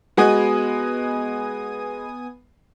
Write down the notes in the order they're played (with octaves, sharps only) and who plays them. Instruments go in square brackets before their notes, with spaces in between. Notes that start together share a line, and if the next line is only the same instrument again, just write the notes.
[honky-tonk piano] G#3 F#4 [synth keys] B3 G#5 D#6